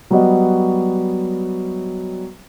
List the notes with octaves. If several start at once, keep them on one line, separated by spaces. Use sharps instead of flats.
F#3 G3 B3 F#4 D#5